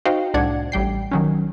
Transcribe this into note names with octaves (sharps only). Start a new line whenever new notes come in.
D#4 F#4 C5 D#5 F5 G5
C2 A2 D4 D5 F#5 G#6
A1 G3 G5 C7
D#3 F#3 C#4